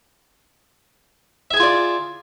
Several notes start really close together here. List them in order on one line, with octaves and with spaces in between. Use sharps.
E5 G#4 G#5 F4 D5